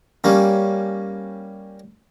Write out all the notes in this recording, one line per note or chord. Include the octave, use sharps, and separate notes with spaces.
G3 A#3 C#4